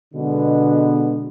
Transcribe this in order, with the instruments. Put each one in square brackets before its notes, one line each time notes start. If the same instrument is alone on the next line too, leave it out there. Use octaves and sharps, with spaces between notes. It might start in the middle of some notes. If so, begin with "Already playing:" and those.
[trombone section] B2 D3 G#3 B3